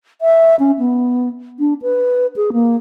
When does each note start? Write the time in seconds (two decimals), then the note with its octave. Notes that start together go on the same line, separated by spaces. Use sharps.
0.21 E5
0.59 C#4
0.79 B3
1.59 D4
1.82 B4
2.36 G#4
2.53 A#3